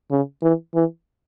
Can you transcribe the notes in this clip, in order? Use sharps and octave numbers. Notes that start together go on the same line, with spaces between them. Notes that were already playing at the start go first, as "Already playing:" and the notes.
C#3
E3
E3